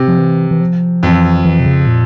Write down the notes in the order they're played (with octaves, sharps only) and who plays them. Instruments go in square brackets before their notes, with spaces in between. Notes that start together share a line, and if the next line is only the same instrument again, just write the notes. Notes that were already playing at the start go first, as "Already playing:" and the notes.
Already playing: [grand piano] C3
[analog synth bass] F3
E3
E3
F3
[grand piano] F2 [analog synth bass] E3
[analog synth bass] E3
C3
C#3
A#2